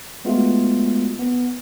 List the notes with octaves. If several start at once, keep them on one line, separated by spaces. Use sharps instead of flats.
G#3 A3 B3 F4 F#4
B3